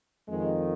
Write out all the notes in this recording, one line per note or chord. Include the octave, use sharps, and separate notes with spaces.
F2 D#3 G#3